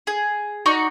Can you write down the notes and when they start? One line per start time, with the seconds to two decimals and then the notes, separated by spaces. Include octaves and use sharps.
0.07 G#4
0.66 D#4 F#4 D5 C#6